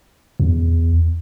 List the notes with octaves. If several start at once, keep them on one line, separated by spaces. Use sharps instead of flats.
E2